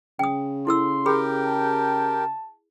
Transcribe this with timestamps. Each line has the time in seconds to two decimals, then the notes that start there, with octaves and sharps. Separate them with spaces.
0.19 C#3 G5 D#6
0.67 E4 A4 C6 E6
1.06 G4 G#4 A#4 G5 B5
1.45 A5